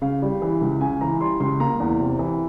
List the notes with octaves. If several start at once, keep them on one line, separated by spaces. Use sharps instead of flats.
C#3 F5
G3
E3
C#2
C#3 G#5
E3 A#5
G3 C6
C#2 C6
A#3 A#5
E2
C3
E3